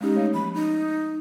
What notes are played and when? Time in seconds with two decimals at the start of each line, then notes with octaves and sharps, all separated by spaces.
0.01 G#3 C#4 D#4 G4
0.15 A3 C#5 F5
0.34 F3 A#3 B5
0.54 D#4